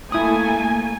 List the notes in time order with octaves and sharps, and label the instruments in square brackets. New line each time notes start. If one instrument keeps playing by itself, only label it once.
[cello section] A3 A#3 [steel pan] E4 D#6 [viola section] G#5